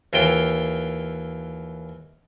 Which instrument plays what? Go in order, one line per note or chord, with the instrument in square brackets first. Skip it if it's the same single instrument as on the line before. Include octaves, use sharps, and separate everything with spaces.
[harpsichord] D#2 E3 F4 G5